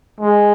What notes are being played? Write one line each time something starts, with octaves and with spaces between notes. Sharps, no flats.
G#3